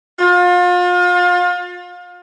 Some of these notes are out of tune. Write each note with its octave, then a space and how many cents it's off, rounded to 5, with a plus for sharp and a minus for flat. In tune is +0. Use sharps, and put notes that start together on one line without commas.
F4 +35